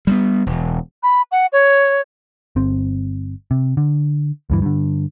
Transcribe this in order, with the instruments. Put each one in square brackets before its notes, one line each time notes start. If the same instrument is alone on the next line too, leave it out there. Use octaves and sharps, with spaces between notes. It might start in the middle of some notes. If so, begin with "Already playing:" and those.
[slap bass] G3 G#3 B3
E1
[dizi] B5
F#5
C#5
[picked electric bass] G1 C4
C3
D3
D2 G2 E3
G2 D3